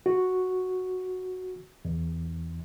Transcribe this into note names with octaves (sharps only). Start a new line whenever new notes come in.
F#4
E2